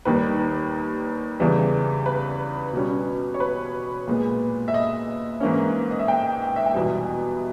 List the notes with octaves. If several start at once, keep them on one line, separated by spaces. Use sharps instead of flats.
D#2 D#3 G3 B4
E2 C#3 E3 G3
B4
B2 G3 C#4
C#5
B4
A#2 G#3 B3
E5
D#5
G#2 E3 A#3 C#4
D#5
E5
G5
E5
G5
E2 B2 G3 G#5